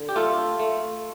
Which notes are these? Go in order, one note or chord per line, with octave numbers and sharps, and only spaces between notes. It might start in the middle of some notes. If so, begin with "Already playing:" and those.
Already playing: D3
G4
A3 F4 A4
A3